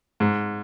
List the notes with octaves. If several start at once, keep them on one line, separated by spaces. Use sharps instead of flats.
G#2